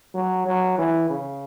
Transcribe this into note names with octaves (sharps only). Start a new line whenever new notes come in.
F#3
F#3
E3
C#3